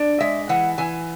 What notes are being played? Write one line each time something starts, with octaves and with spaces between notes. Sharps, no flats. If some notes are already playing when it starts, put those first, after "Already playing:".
Already playing: D4
G#3 E5
E3 F#5
E3 G#5